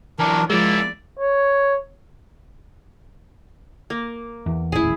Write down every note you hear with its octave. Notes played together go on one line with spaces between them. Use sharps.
E3 F#3 D4 A#4
F3 G#3 A#3 E4 D5 E6
C#5
A#3
E2
D#1 A1 E4 G#4